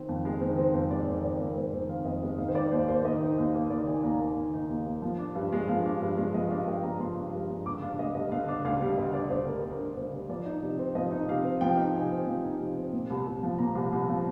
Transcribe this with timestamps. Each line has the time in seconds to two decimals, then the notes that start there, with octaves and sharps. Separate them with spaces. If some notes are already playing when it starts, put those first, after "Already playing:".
Already playing: D#3 C4
0.09 F2
0.25 G#3
0.41 D#3 C5
0.57 C4 C5
0.74 F2 C5
0.91 G#3 D5
1.07 D#3 D5
1.23 C4 D5
1.39 F2 A#4
1.56 G#3 C5
1.73 D#3 C5
1.89 C4 F5
2.05 F2 D#5
2.23 G#3 D#5
2.38 D#3 F5
2.48 C5
2.55 D#4 D5
2.72 D#2 C5
2.88 A#3 C5
3.05 D#3 D#5
3.21 D#4
3.38 D#2
3.54 A#3
3.70 D#3 D5
3.87 D#4 G#5
4.03 D#2 A#5
4.19 A#3 G#5
4.36 D#3
4.54 D#4
4.69 D#2
4.87 A#3
5.02 F3
5.19 D4
5.35 G2
5.52 G#3
5.68 F3 F5
5.85 D4
6.02 G2
6.18 G#3
6.34 F3 D#5
6.50 D4 F5
6.67 G2 G5
6.83 G#3 A#5
7.00 F3 C6
7.17 D4
7.33 G2
7.49 G#3
7.66 D3 D6
7.82 D4 F5
7.99 D2 D#5
8.15 G3 D#5
8.32 D3 F5
8.48 D4
8.64 D2 F5
8.81 G3
8.98 D3 D#5
9.14 D4 D5
9.30 D2 C5
9.47 G3 A#4
9.63 D3 A#4
9.80 D4
9.96 D2 C5
10.13 G3
10.29 F3 D5
10.45 D#4
10.62 C3
10.79 C4
10.95 F3 D#5
11.11 D#4
11.28 C3 F5
11.44 C4
11.61 F3 G5
11.77 D#4
11.94 C3 G#5
12.11 C4
12.27 F3
12.44 D#4
12.60 C3
12.76 C4
12.93 A#2
13.10 C2
13.27 C2
13.43 F3
13.58 A#2 A#5
13.75 C2
13.92 C2
14.09 F3